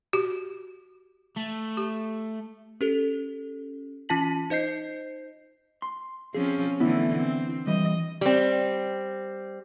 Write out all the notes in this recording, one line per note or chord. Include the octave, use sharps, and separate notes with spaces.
F#4 G4
A3
G4
C#4 G4 A4
E3 C#4 F4 A5 B6 F#7
D#4 C5 D#5 G6 C7
C6
F3 C4 C#4 G#4
D3 E3 A3 B3 E4
C4
E3 G3 D#5
G3 C4